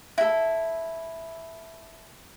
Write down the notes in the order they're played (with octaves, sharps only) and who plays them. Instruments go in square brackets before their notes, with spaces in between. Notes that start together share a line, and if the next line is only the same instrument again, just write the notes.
[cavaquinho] E4 A4